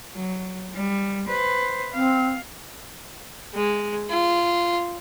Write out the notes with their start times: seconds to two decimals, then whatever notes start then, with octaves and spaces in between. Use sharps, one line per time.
0.14 F#3
0.74 G3
1.27 B4 C5
1.94 C4 F5
3.54 G#3
4.10 F4